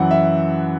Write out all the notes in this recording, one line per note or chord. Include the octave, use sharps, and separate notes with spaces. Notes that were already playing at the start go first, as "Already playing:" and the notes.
Already playing: F#2 E3 F#5
E5